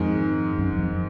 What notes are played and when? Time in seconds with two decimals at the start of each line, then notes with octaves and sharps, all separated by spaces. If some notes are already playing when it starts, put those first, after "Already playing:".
Already playing: F2 G#2 D#3 G#3
0.58 F#2
0.79 F2